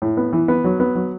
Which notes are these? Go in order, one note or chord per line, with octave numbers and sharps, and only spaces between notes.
A2
B3
E3
B3
F#3
B3
F#3